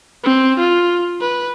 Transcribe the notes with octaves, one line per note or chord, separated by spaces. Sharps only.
C4
F4
B4